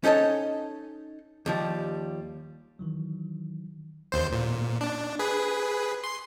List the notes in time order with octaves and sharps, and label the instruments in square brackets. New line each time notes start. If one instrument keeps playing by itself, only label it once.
[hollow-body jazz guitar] C#4 D#4 A4 C#5 D#5
D#2 F3 G3
[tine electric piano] D#3 E3 F#3
[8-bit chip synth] D#2 C5
A#2
D4
G#4 B4
C6